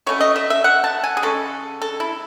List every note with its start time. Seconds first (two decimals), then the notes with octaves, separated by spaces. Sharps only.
0.06 B2 A3 C#4 C#5
0.20 D#5
0.36 E5
0.50 E5
0.64 F#5
0.84 A5
1.04 G#5
1.17 G#4
1.22 C#3 G#3 C#4 A4
1.82 A4
2.00 E4